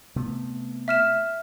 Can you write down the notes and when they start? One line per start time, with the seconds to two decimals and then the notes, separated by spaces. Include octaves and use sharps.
0.16 C3 A3 B3
0.88 E5 F6 E7